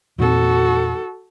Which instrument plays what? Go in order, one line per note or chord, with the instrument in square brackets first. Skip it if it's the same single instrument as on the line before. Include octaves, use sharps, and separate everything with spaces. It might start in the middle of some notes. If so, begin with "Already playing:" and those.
[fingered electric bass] E2 A#2 C4 [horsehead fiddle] F#4 A4